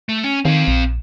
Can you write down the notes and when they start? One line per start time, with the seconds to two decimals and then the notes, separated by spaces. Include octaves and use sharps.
0.09 A3
0.24 C#4
0.45 D#3 C4 F5
0.68 A#1